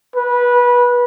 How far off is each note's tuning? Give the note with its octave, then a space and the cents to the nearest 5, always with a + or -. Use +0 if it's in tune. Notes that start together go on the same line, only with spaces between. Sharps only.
B4 -20